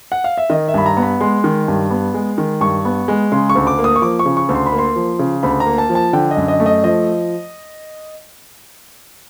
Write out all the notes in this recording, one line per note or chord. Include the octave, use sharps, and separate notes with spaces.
F#5
F5
E5
D#3 D#5
E5
G2 B5
A#5
B3
B5
G#3 C6
D#3
G2
B3
G#3
D#3
G2 C#6
B3
G#3
C#3 C6
C#6
D2
D6
A#3
D#6
C#6
F3 D6
C#6
C#3
C#6
D2
C6
B5
A#3
C6
F3
C#3
D2 B5
A#5
A#3
A5
F3
A5
D3 G5
D#5
F#2
D#5
A3
D#5
F3 D#5